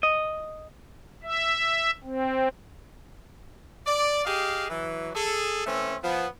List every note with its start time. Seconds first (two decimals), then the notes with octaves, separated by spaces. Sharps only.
0.03 D#5
1.23 E5
2.04 C4
3.86 D5
4.25 G4 G#4 D#5 F5
4.69 E3 F#3
5.15 G#4 A4
5.66 E3 A3 C4 C#4
6.02 F3 B3